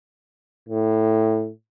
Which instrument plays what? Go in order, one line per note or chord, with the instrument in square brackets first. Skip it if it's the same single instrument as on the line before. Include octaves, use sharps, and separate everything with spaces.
[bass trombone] A2